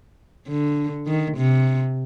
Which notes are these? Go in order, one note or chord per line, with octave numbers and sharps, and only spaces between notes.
D3
D#3
C3